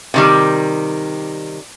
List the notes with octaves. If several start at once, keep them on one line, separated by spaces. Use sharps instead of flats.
C3 D#3 G3